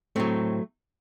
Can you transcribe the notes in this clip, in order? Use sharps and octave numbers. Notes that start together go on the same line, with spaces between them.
A2 F#3 A3 C4